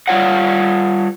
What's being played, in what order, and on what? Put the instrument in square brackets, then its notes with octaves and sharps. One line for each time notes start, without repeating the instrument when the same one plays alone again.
[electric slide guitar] G3 F4 C#5 F#5